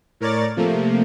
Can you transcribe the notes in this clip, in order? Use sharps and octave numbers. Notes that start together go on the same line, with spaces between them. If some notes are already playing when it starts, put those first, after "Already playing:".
A2 A#4 C#5 D5 A6
C3 F3 A3 A#3